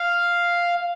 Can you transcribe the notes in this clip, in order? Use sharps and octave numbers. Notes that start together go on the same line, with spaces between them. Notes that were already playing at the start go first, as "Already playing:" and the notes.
Already playing: F5